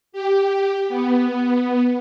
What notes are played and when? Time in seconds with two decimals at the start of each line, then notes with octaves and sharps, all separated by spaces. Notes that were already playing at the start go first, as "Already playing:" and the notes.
0.12 G4
0.89 B3